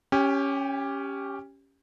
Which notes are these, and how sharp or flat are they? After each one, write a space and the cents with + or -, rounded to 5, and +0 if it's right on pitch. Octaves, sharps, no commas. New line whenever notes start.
C#4 +0 G4 +0 G#5 -45